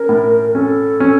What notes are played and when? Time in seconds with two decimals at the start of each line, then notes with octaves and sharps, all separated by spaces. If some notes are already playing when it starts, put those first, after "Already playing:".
Already playing: C#4 A#4
0.09 A2
0.54 C#4 A4
1.00 C#4